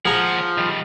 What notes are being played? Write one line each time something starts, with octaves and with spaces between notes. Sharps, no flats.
D#2 F3 G#4 F#5 A#5
D#3 G3